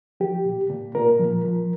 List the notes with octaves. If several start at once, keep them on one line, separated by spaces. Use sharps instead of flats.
F3 G4
A#2
A#2
A#2 A#4
F3
F3